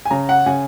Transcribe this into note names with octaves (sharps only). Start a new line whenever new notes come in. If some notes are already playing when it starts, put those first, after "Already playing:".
G#5
C#3 A#5
F#5
C#3 G#5